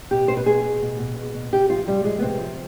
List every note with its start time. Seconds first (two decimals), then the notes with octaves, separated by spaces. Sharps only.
0.11 B2 G4
0.28 B2 C5
0.37 B4
0.46 B2 G#4
0.64 B2
0.82 B2
0.99 B2
1.17 B2
1.34 B2
1.52 C3 G4
1.70 F3 F4
1.87 C3 G3
2.05 F3 G#3
2.19 B3
2.22 C3 C4
2.40 F3